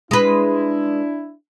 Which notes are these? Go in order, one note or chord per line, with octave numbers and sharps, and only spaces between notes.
G#3 D4 E4 B4